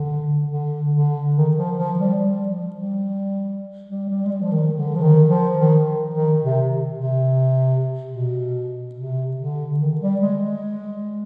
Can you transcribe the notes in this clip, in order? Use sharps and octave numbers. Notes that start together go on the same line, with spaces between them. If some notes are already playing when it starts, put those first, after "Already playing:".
Already playing: D3
D3
D3
D#3
F3
F3
G3
G3
F3
G3
G3
G3
G#3
G3
F3
D#3
D3
F3
D#3
F3
D#3
D#3
C3
C3
B2
C3
D3
D#3
G3
G#3
G#3